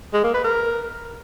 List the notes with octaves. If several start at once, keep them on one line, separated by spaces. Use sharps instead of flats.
G#3
A#3
B4
A#4